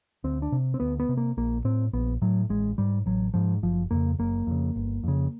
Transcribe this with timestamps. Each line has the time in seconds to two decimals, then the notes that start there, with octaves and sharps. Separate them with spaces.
0.24 D2 C4
0.42 D4
0.52 C3
0.74 C4
0.80 D2 B3
1.00 B3
1.09 C3
1.17 A#3
1.37 A#1 A#3
1.65 A2 C4
1.93 A#1 B3
2.22 A2 F#3
2.49 A1 G#3
2.78 G#2 G3
3.06 A1 F#3
3.34 G#2 F3
3.63 F#1 F3
3.91 F2 C#3 A#3
4.19 F#1 A#3
4.47 F2 C#3
4.75 G1
5.04 F2 C#3